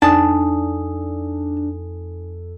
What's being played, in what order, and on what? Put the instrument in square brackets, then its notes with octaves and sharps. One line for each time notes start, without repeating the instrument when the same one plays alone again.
[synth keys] F2 A4 [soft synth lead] D4 [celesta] D#4 G#5 D#6 [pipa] A5